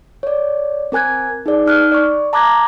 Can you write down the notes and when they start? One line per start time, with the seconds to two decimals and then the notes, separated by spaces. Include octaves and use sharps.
0.23 C#5 D5
0.92 C4 A#4 G#5 F#6 G#6
1.46 D#4 G#4 D5
1.66 D#4 F6 F#6
1.92 D5 C#6
2.33 A5 A#5 D6 F#6 G#6 A#6